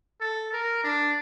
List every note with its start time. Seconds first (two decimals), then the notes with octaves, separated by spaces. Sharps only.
0.21 A4
0.53 A#4
0.84 D4